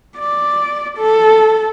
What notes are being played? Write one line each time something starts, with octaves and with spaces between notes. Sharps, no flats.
D5
A4